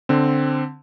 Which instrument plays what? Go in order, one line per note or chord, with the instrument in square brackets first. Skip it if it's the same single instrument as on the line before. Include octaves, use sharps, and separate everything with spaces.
[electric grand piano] D3 C4